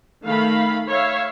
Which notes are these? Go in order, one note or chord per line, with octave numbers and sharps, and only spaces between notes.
D#3 A3 F5 B5
C#5 E5 F5